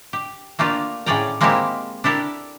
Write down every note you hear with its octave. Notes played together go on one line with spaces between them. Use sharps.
G4
A3 A#3 D4 F4 G4
A2 C#4 G#4 D5 G5 A#5
G#3 A#3 C4 D#4 E4 G4
D4 E4 G4 A4 A#4